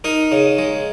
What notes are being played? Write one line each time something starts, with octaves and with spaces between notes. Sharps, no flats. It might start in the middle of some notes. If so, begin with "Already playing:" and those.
D#4 A#4
C#3
G#3